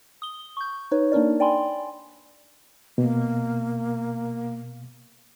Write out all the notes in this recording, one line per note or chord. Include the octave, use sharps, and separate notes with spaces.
D#6 G7
C#6 G6
D#4 B4 C#5
A#3 D4 D#4 A#4 D5
D5 G5 G#5 B5 C6
B2 A#3